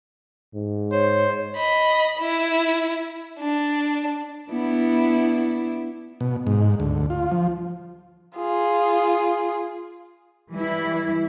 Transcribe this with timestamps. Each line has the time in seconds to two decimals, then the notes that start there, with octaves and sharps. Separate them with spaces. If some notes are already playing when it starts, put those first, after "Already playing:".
0.54 G#2
0.92 C5 C#5
1.56 D#5 B5
2.19 E4
3.40 D4
4.50 B3 D4 E4
6.21 B2
6.47 G#2
6.80 D2
7.10 F4
7.32 F3
8.38 F4 G#4
10.53 E3 G3 E4